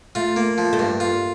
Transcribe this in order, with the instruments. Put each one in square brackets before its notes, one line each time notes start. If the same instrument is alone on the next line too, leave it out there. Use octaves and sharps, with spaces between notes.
[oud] A3 [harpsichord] F4
[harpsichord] A#3
F3
[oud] A3
[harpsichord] G2 [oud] A#3
[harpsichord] F4